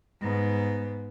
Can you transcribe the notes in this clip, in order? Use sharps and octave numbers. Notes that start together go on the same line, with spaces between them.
G#2 B3